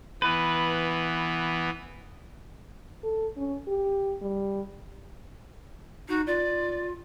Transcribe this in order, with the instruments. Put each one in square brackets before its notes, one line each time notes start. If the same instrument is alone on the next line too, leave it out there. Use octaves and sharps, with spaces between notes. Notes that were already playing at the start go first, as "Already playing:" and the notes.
[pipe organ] E3 B3 [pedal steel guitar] B4
[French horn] A4
C#4
G4
G3
[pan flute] D#4 [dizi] F#4
[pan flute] F4 [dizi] D5